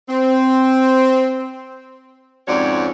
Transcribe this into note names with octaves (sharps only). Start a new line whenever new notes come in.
C4
F2 G#2 C#4 F#4 C#5 D5